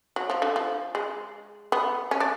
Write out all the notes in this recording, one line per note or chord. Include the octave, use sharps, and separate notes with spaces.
F#3
F3
D3
F3
G#3
B3
C#4
D4